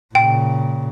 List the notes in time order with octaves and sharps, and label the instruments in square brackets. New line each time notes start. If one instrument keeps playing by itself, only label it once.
[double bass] A#2 C#3 [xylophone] G5